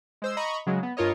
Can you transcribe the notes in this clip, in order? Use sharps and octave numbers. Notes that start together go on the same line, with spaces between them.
G#3 C5 E6
D#5 A#5 B5 C#6
C#3 F#3 G#3
B3
G2 F4 A#4 C#5 D#5